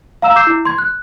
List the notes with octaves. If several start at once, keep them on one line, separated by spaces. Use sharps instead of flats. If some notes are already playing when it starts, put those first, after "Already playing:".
F5 A#5 E6 E7
D6 E6 G6 C7 E7
E4
C6 G#6
F#6